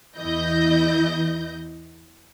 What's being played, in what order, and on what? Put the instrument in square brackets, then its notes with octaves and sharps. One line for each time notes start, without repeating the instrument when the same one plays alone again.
[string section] E2 E3 E4 D#5 G6